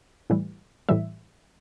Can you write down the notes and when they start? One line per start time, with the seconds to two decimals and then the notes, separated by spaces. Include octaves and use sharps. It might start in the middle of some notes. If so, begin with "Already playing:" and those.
0.30 A2 E3 G3
0.89 A2 E3 G3 E5